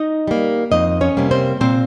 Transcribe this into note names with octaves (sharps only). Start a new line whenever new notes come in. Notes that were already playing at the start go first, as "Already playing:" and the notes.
Already playing: D#4 D#5
G3 A#3
F2 D#4 D#5
C#4 C#5
C3 G3 A#3
C4 C5
A#2 C4 C5